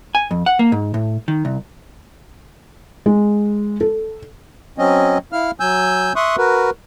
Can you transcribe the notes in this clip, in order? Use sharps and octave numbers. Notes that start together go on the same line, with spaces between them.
G#5
F2
F#5
A#3
G#2
A2
D#3
C2
G#3
A4
F#3 C4 C#4 D#5
E4 F5 F6
F#3 G#5 E6 G6
E5 C6 C#6 D#6 F#6
F#4 A#4 B4